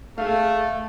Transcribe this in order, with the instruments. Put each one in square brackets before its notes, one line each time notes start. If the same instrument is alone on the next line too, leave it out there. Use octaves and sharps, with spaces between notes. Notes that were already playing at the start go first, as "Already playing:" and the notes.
[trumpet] A3 [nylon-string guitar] G#4 F5